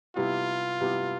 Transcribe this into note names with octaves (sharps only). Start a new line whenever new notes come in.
C3 G3 B3 E4 F4 G4
C3 G3 B3 E4 G4